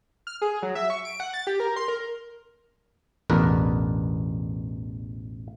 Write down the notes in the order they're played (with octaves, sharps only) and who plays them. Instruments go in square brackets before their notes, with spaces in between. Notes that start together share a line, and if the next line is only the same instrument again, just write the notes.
[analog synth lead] F6
G#4
F#3
E5
C#6
D7
F#5
A6
G4
A#4
C6
A#4
[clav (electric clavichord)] A1 E2 B2 D4 A#4 B4